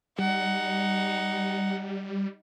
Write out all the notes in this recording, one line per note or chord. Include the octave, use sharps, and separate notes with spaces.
G3 D#4 F#5